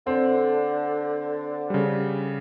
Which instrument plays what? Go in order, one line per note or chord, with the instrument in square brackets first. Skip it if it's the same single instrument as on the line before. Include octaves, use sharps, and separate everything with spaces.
[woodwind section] D3 [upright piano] C4
[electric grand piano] C#3 G3